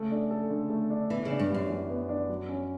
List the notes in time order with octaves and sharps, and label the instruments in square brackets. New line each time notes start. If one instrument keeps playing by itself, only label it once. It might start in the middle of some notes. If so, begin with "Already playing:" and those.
Already playing: [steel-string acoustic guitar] C#3 [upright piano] A3
[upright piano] D4
A4
D3
A3
D4
[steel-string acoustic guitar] E3 [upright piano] B3
[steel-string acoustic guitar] C#3
[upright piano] D4
[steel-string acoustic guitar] G2
[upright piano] G4
[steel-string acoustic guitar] F#2
[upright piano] E3
B3
D4
F#3
C#4